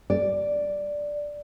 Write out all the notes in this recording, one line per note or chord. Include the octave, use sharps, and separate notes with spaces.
D5